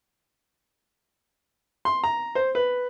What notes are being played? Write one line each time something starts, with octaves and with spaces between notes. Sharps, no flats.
C6
A#5
C5
B4